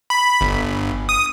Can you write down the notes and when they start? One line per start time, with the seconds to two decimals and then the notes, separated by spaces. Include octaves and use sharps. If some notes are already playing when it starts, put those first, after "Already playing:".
0.10 B5
0.41 G1
1.09 D#6